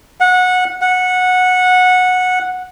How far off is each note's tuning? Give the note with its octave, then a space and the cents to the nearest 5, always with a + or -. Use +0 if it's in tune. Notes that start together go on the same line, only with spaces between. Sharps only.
F#5 -20
F#5 -15